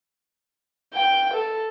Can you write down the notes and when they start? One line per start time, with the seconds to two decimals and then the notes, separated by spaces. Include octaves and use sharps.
0.94 G5
1.34 A4